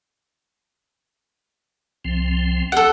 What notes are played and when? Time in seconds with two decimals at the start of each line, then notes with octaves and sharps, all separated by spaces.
2.05 C2 F3 C4
2.72 G4 A4 F#5